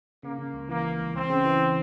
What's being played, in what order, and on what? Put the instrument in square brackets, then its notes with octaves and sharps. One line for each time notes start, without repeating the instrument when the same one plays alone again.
[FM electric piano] C#3 [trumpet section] A#3
[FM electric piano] C#3
C#2
[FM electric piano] E3 [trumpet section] A#3
[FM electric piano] E3
C#2
[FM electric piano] C#2 [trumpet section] C4
[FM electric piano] C#3
E3